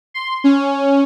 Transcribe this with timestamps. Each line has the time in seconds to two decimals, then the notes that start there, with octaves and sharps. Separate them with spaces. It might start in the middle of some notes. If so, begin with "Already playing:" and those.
0.14 C6
0.44 C#4